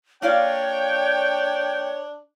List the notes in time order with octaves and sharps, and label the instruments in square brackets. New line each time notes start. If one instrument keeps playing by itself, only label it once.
[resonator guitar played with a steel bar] A#3 F4 D5 [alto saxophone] D4 [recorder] C#5 [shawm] G5